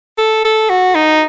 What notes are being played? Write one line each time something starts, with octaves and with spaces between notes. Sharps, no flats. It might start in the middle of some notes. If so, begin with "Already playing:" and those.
A4
A4
F#4
D#4